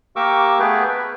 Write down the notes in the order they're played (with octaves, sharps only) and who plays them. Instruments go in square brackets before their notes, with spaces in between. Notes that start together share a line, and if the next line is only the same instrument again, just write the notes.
[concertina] A#3 G4 A#4 C#6 D6 E6
A3 B3 G#4 B4 G5
B4